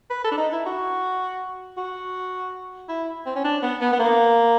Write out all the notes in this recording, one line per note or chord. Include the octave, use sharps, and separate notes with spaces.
B4
A4
D4
D#4
E4
F#4
F#4
E4
C4
C#4
D4
B3
B3
B3
A#3